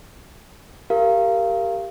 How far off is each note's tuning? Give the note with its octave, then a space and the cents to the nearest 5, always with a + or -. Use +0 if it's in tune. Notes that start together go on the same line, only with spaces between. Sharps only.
G4 +0 A#4 -15 F5 -25